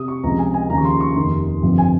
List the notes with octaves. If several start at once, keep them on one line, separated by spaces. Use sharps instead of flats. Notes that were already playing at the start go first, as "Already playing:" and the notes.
Already playing: C3 D#6
C#6
C#2 C3 F3 A#5
G#5
G#5
D#2 C#3 F3 A#5
C#6
C6
C#6
F1 D#2 D#3 C6
G1 F2 C3 F3
G#5